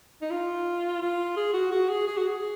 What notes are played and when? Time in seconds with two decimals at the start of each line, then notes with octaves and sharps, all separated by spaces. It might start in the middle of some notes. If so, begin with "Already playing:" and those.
0.22 D#4
0.31 F4
1.02 F4
1.37 G#4
1.53 F#4
1.72 F#4
1.89 G#4
2.07 G#4
2.17 F#4
2.28 G#4